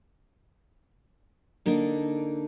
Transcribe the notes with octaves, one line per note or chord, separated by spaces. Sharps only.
D3 A#3 D4 D#4 A4